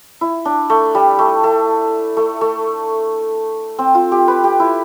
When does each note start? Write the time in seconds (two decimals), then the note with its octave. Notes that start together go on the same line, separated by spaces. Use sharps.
0.21 E4
0.45 D4
0.70 A3
0.95 G3
1.19 A3
1.44 A3
2.17 A3
2.41 A3
3.78 C4
3.95 F4
4.12 G4
4.28 B4
4.44 G4
4.60 E4